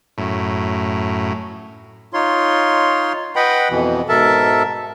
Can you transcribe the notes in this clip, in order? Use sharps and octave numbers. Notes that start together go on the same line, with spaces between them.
F#2 A2
D#4 F4 C#5 C6
B4 D#5 F#5 G5 B5
F2 B2 E3
G#2 B2 A4 A#4 E5 A5